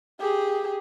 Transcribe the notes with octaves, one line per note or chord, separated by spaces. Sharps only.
G4 G#4